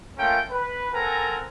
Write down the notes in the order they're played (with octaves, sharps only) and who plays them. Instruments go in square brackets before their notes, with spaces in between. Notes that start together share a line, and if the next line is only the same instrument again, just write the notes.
[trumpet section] A3 A#3 C#4 F4 A#4 G5
B4
C4 A4 A#4 F#5 G#5 A#5